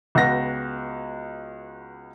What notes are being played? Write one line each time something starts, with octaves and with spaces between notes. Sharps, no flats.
C#2 B3 F#4 A#6